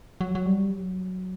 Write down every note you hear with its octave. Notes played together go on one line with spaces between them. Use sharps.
F#3
F#3
G3
F#3